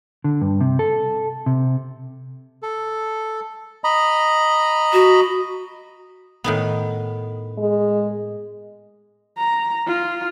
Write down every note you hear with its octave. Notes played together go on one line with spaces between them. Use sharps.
D3
G2
C3
A4
C3
A4
D#5 A#5 B5
F#4
A2 D#3 B3
G#3
A#5
F4